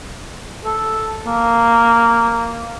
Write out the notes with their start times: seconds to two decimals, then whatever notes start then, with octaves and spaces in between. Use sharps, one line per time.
0.65 A4
1.26 A#3